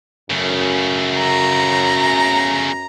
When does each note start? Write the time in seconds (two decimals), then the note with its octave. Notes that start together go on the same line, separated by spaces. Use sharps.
0.30 F#2 C#3 A3
1.19 A#5